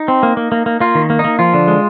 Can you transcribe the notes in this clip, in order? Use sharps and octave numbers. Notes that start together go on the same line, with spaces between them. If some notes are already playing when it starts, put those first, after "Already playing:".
Already playing: D#4
C4
A#3
A#3
A#3
A#3
A#3 F4
D#3
A#3
D#4
A#3
F3 F4
D3
G#3